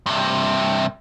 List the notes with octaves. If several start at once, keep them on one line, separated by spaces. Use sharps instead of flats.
G2 C3